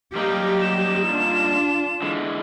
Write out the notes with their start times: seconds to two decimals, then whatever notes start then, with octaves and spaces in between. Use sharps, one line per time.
0.15 F#3 G3 A#3 D#4 G4
0.61 E7
1.05 D4 F4
2.02 D3 E3 G#3